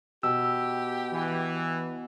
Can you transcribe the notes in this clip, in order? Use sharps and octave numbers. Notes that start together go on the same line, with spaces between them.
B2 G4 E6
E3